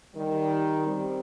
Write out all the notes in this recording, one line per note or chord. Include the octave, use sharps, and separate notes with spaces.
D#3 G3
G3 C4